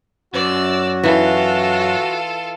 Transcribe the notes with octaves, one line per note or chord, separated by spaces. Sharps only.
F#2 F#4 D5 E6
E3 F4 A4